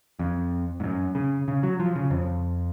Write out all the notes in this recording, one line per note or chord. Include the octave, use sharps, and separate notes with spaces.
F2
G#2
F#2
C#3
C#3
F#3
F3
C#3
F2